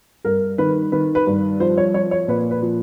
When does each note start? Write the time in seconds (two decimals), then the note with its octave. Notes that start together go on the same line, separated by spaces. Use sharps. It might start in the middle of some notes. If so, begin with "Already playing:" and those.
0.25 G2 A#4
0.58 D#3 B4
0.92 D#3 B4
1.15 B4
1.27 G2
1.60 F3 C5
1.78 C#5
1.94 F3 C#5
2.11 C#5
2.28 A#2 B4
2.51 B4
2.62 F3